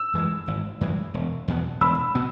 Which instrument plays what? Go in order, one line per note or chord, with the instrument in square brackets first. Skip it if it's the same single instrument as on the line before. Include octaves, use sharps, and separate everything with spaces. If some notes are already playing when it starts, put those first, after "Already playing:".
Already playing: [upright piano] E6
[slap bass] F#2 E3 G#3
G#1
F#2 E3 G#3
E1
E2 B2 B3
[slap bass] E1 [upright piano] B5 E6
[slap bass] B2 B3